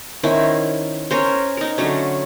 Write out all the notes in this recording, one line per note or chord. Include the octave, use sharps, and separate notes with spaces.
D#3 C#4 E4 C5
C#4 A#4 C5
D#4 A#4
D3 F#3 A3 C#4